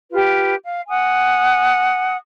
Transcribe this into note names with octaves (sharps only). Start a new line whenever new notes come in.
F4 G4 B4
F5
F#5 G#5 D#6